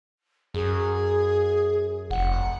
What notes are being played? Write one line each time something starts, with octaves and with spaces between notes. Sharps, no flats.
F#2 G#4
F1 F#5